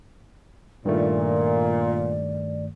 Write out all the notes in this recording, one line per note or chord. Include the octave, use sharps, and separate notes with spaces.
G2 A#2 D#3 A3 D5